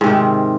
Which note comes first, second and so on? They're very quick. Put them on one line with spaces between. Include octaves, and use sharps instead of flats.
G#2 C3 D#3